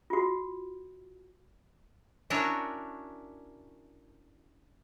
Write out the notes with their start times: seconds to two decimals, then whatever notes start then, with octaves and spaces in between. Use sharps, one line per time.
0.10 F4 F#4
2.30 C#4 D4 E4 F#4 A#4 C#5